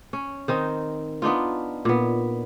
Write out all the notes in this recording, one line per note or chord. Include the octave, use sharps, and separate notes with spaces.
C#4
D#3 C4 D#4
B3 D4 D#4 F4
A#2 B3